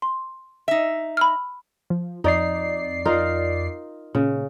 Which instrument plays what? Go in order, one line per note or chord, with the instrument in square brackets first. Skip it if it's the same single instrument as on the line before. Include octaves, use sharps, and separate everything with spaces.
[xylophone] C6
[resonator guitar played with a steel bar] D#4 E5
[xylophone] B5 E6 F6
[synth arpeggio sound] F3
[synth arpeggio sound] F2 D5 C7 [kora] D#4
[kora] D#4 F4 A#4
[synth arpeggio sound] A#2 [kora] C#3